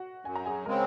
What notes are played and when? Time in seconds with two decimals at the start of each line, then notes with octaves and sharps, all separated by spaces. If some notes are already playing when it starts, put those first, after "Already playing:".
Already playing: F#4 F#5
0.25 F#2 G#5
0.35 A#5
0.46 G#4 G#5
0.65 C#3 G#3 C4 A#4 A#5